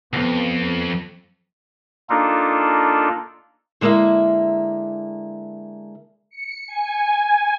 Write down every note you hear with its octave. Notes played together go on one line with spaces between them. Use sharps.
C2 F2 B3
A#3 D4 D#4 F4 A4
D3 G#3 A#3 E4 E5
C#7
G#5